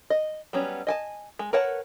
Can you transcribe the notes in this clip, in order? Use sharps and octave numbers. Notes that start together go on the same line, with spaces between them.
D#5
F#3 G3 B3 C#4
D#5 G#5 A5
G#3
A#4 B4 C#5 F#5 A5